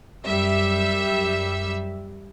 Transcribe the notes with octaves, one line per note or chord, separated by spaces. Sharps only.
F#2 G3 E5 E6